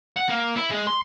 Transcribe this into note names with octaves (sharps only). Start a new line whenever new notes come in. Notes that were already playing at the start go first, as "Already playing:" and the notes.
F#5
A#3
E4
G#3
C6